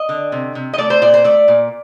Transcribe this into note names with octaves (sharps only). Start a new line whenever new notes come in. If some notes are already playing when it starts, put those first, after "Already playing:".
Already playing: D#5
D3
C3
C3
D#5
A3 D5
C5
A#2 D5
C5
A3 D5
A#2